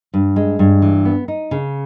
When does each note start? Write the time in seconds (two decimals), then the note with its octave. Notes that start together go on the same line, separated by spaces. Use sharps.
0.14 G2
0.36 G#3
0.59 G2
0.82 E3
1.05 B3
1.28 D#4
1.51 C#3